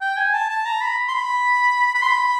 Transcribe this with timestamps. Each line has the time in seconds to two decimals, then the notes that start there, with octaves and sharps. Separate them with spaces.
0.01 G5
0.17 G#5
0.34 A5
0.49 A5
0.66 A#5
0.81 B5
1.08 C6
1.14 B5
1.95 B5
2.02 C6
2.10 B5